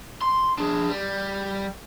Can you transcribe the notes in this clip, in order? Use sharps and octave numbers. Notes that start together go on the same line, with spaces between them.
C6
D4 G#4
G3